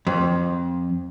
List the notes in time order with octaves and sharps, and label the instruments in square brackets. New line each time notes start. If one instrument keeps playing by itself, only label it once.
[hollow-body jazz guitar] F2